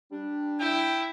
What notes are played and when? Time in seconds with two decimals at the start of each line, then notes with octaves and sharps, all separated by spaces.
0.11 G3 D4
0.60 E4 G5